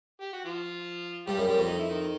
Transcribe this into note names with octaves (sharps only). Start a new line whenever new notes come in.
G4
F#4
F3 F4
G2 G3 G4
F#2
G#4
F#2 G3 G4
F2
D#4
E4
D#3 D#4